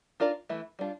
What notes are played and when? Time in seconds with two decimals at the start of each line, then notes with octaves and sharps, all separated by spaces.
0.20 D4 F4 A#4 D5
0.49 E3 A3 E4
0.79 G3 D4 F4